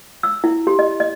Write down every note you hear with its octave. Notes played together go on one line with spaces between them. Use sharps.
E6
E4
G4
D#5
D#5